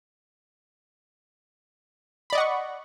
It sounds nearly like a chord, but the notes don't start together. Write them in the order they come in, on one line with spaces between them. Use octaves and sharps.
B5 D5 D#5 F#5 C#6